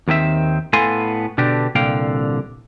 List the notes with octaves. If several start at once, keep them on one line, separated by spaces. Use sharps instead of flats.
D#2 D#3 C4 E5
A2 B3 A4 F5 G#5 C6
B2 D3 D4 G4
C2 A#2 D3 F5 G5